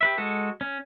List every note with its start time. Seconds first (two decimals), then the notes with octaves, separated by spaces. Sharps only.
0.01 G4 B4 E5
0.18 G#3 F#4 A4
0.61 C#4